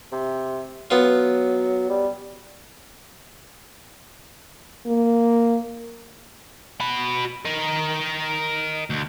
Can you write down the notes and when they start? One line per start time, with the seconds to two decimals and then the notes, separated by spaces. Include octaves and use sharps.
0.12 C3
0.91 F#3 B3 F4
1.90 G3
4.86 A#3
6.81 F#4 B5
7.45 A#4 D#5
8.90 D2